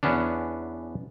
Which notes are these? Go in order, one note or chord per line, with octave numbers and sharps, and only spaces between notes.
E2 B3 C#4 D4